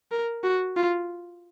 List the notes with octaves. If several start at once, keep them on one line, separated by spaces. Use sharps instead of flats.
A#4
F#4
F4